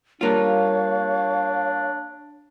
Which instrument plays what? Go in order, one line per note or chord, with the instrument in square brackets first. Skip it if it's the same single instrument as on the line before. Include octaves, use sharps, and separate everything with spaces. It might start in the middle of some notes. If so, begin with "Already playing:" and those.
[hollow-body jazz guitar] G3 A#3 F4 [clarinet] D4 [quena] C#5 [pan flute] F5